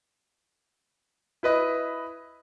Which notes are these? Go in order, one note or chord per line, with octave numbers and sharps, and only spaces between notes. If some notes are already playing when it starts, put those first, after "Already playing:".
E4 B4 D#5